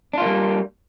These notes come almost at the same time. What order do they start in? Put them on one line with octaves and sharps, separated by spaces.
D4 F4 A#3 G3